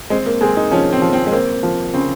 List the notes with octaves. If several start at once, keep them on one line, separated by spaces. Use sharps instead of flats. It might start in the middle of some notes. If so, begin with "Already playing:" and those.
G#3 C4
A#3
G#3 C4
D#4
F3 C#4
C4
F3
C4
G#3
A#3 C4
F3
C#3 C4